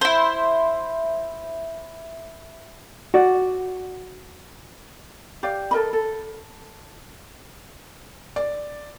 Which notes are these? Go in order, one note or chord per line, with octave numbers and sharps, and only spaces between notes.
E4 C5
F#4 D5
G4 D5 F5
A4 A#4 D#5 B5
A4
D5